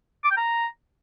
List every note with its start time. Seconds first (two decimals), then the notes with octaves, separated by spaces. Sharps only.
0.24 D6
0.31 G5
0.37 A#5